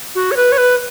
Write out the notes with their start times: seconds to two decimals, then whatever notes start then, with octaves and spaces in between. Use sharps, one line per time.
0.15 F#4
0.31 C#5
0.37 B4
0.52 C#5
0.57 B4